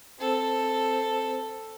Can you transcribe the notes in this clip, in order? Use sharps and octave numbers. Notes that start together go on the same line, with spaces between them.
C4 A4